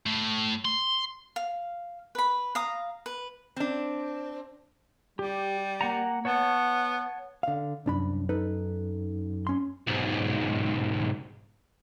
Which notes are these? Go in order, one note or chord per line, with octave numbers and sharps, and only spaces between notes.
A2
C6
F5
B4 B5
F5 A#5 D#6
B4
C4 D4
G3 G4
A#3 F#5 A#5
B3 C#5 F#5 A5
D3 F5
C2 F#2 D4 B5
D#4 A4 B4
C#4 C6
B1 G#2